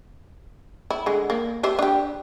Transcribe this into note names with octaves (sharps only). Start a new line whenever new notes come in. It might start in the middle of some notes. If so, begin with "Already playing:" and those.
E4
D3 G#3
A#3
G4 C5 E5
D4 G4